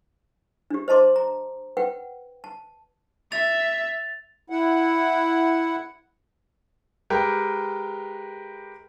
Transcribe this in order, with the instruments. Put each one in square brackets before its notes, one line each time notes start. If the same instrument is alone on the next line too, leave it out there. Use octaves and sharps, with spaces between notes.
[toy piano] D4 G4
C5 D#5 A5 C6 D6
A#5
B4 F#5 G5
A5
[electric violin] E5 [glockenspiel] A6 F7
[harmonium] E4 F#5
[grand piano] G#3 G4 A#4 B4 G5